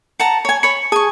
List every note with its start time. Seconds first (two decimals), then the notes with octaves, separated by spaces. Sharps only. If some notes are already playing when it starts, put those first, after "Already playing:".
0.20 F#5 A5 A#5
0.45 C#5 G#5
0.63 C#5 B5 C#7
0.92 G#4 G#5 A5 C#6 D#6